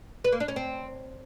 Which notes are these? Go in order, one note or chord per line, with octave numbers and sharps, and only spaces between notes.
B4
A#3
D4
C#4
C4